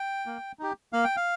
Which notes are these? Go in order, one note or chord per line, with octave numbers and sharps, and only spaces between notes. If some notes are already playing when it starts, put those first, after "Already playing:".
Already playing: G5
A#3
D#4 G4
A#3 F5
G5
F5